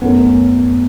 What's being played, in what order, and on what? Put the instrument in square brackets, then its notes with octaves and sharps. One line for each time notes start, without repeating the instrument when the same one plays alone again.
[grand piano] F#2 D#3 A3 C#4 [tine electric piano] B3